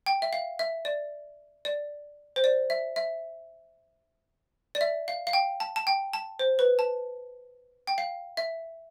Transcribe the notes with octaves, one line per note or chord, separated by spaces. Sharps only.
G5
E5
F5
E5
D5
D5
C5
D5
E5
E5
D5
E5
F5
F5
G5
A5
A5
G5
A5
C5
B4
A5
G5
F5
E5